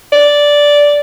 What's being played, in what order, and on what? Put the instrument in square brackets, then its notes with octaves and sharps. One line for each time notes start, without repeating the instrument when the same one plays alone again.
[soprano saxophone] D5